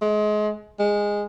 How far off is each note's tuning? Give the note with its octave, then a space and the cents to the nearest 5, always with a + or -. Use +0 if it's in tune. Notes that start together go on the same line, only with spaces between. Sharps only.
G#3 +30
G#3 -10